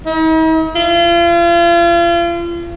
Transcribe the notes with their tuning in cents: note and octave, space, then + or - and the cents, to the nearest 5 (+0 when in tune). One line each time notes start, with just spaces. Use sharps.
D#4 +45
F4 -40